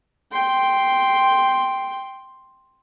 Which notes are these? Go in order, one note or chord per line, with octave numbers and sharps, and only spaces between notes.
G5 C6